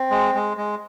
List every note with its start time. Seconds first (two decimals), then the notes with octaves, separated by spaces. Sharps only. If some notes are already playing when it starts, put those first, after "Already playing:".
Already playing: C4
0.10 G#3
0.35 G#3
0.57 G#3